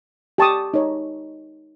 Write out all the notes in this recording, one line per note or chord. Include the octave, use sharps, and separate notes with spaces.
G4 A5 C#6 D#6
D#4 C#5